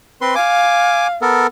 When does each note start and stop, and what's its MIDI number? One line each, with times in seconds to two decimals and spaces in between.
0.21 0.35 60
0.21 0.35 71
0.21 0.35 84
0.35 1.16 77
0.35 1.07 80
0.35 1.07 86
1.22 1.47 59
1.22 1.47 69
1.22 1.47 70